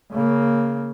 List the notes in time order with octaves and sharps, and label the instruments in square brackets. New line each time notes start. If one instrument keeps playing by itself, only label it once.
[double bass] C#3 A#3